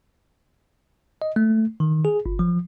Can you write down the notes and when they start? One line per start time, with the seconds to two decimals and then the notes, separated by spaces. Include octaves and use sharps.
1.22 D#5
1.36 A3
1.80 D#3
2.05 G#4
2.26 G1
2.39 F3